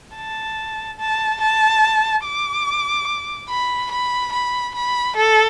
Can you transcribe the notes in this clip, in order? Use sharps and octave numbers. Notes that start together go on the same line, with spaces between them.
A5
A5
A5
D6
B5
B5
B5
B5
A4